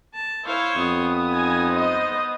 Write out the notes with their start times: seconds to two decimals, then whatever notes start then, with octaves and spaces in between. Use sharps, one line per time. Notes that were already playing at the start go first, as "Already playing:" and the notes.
0.14 A5
0.44 E4 C5 C#5 F5
0.77 F2 B3 D#6
1.32 D#4 G#5
1.71 C5 D#5